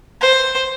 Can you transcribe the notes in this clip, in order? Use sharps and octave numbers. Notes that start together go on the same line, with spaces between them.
C5